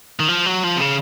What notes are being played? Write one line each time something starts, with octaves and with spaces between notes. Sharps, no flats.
D#3
F3
F#3
F3
C3
C#3